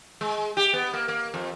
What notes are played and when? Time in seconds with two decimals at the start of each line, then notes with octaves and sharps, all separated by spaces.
0.21 G#3
0.57 G4
0.73 B3
0.93 A#3
1.08 A#3
1.34 F2